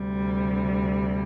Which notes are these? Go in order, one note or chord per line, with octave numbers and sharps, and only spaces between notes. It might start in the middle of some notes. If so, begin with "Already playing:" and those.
Already playing: D2 C3 G3